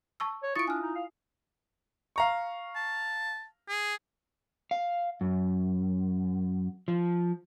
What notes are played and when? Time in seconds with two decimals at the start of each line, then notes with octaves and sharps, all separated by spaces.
0.20 A5 C#6 E6
0.43 C#5
0.56 E4 F4 C#6 D#6 A6 D7
0.68 D4 G#5 F6
0.82 D#4
0.95 F5
2.16 F5 A#5 C#6
2.76 A5
3.69 G#4
4.71 F5
5.21 F#2
6.88 F3